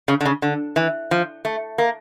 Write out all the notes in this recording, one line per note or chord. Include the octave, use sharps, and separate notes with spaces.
C#3
D3
C#3
D3
E3
F3
A3
A#3